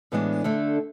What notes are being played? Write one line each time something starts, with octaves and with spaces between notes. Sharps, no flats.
A2 E3 G#3 B3 D4
D3 A3 D4 A4